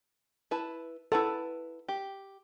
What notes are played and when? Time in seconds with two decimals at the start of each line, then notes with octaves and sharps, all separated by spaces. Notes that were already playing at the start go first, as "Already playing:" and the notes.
0.51 E4 B4 A5
1.12 E4 A4 B4 F#5
1.88 G4